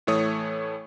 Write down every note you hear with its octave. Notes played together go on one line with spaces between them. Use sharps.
A2 E3 A3 C#5 D#6